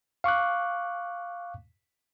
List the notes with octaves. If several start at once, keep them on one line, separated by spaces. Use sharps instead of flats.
F5 C#6 D6 F#6